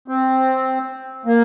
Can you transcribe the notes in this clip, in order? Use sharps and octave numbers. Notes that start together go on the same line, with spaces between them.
C4
A#3